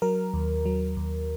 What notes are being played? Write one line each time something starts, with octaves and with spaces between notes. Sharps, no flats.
F#3 A#4
D#2
F#3
D#2